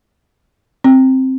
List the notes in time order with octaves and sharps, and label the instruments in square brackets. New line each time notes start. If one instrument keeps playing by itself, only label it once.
[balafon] C4